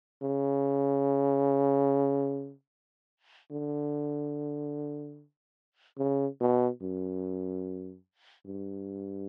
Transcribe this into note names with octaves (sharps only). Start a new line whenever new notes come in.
C#3
D3
C#3
B2
F#2
G2